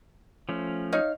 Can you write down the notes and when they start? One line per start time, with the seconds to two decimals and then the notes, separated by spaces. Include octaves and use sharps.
0.49 F3 A3 C#4
0.92 D#4 C#5 F5